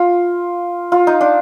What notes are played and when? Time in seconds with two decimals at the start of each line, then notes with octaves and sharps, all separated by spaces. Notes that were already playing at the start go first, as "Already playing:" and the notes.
Already playing: F4
0.92 F4
1.07 D#4
1.21 D4